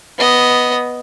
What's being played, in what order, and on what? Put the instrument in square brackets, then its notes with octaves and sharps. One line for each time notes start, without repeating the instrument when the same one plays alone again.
[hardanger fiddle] B3 D#5